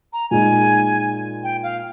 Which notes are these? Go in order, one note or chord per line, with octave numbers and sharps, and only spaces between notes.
A#5
A#2 G#3 D#4 G#5
G5
F5